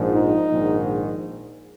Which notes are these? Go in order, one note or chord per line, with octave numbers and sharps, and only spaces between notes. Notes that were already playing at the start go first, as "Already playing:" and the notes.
Already playing: A#1 G#2 F3
D#4
A#1 G#2 D#3